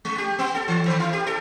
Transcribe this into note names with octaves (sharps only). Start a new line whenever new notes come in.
G#3
G4
B3
A4
E3
D#3
E4
G4
A4